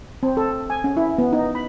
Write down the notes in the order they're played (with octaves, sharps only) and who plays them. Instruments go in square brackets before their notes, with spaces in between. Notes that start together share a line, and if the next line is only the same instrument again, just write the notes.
[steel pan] C4
A4
G#5
C#4
E4
B3
D#4
B5